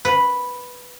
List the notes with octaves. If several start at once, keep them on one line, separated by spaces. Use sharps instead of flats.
B4